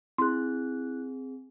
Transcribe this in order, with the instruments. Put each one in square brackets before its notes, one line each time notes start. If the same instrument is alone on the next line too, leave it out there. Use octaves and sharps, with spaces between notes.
[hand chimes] C4 G#4 [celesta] E4 F#6 [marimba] C6